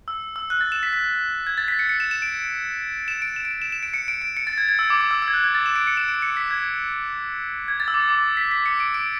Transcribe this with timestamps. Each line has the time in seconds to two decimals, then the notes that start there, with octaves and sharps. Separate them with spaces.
0.08 E6
0.36 E6
0.50 F#6
0.61 A6
0.72 E7
0.83 B6
0.93 B6
1.47 G#6
1.58 A6
1.68 B6
1.79 C#7
1.89 C#7
2.00 E7
2.11 E7
2.22 D7
3.08 E7
3.22 D7
3.36 E7
3.45 D7
3.51 E7
3.62 E7
3.72 E7
3.83 D7
3.94 C#7
4.08 D7
4.22 D7
4.37 C#7
4.47 A6
4.58 G#6
4.69 G#6
4.79 E6
4.90 D6
5.01 D6
5.11 E6
5.22 E6
5.28 G#6
5.33 F#6
5.44 G#6
5.55 A6
5.66 E7
5.76 D7
5.87 C#7
5.97 E7
6.08 D7
6.22 C#7
6.37 B6
6.51 G#6
7.68 G#6
7.80 A6
7.88 E6
7.94 D6
8.09 D6
8.37 B6
8.51 B6
8.66 C#7
8.80 D7
8.94 D7